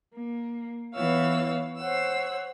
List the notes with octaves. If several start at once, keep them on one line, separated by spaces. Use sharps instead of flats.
A#3
E3 B3 E4 C#5 F5 E6
C5 C#5 F#5 E6